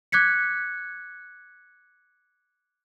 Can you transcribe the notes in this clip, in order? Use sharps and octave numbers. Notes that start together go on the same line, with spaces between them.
D6 F#6 G#6 B6 C#7